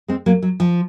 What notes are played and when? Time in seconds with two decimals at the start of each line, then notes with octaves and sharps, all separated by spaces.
0.08 G#3 C4
0.26 F#3 A#3
0.42 F#3
0.60 F3